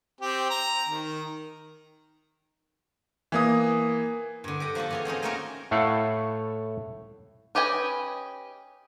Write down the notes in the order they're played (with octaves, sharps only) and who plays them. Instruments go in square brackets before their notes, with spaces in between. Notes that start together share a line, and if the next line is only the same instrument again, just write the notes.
[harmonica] C4 G4
A#5
D#3
[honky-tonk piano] E3 A#3 D#6
[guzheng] G2 D3
G4 D#5 F#5
F3 A#3 F#4 A4
E3 C#4 G#4
F3 C4 C#4 D#4
A3 A#3 C#4 D#4 F#4 A#4
[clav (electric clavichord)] A2 A3 E4 A4 F5 F#5
[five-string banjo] C#4 G4 B4 D#5 G#5